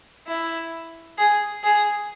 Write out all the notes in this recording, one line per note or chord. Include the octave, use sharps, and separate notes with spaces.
E4
G#4
G#4